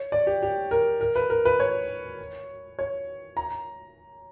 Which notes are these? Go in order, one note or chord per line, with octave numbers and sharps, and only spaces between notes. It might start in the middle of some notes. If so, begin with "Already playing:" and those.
Already playing: C#5
D5
G4
G4
A#4
A#4
B4
A#4
B4
C#5
C#5
A#5